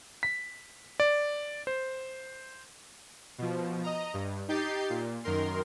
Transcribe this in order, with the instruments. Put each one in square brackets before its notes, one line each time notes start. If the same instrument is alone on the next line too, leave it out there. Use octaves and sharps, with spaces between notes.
[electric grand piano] B6
D5
C5
[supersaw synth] B2 F3
D#5 A#5
G2
D#4 G4 G6 A6 C7
A#2
F#2 D#3 A#4 C6